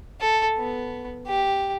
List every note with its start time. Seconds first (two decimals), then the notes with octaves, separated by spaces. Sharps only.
0.21 A4
0.58 B3
1.27 G4